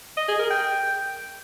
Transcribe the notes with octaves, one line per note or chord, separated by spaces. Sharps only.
D#5
G#4
A#4
G5